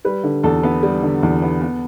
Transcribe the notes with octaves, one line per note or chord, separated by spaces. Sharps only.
G3 B4
D3
E2 A4
B3
G3
D3
E2
B3
B3